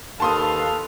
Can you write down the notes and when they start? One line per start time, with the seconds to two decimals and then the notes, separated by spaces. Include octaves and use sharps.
0.20 D#2 A4 B4 F5 A5 C6 D#6